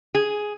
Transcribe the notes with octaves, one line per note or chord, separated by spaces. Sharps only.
G#4